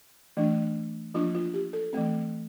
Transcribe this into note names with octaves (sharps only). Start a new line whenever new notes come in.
E3 A3 D4
F3 A#3 D4 F4
F4
G4
A4
E3 A3 C4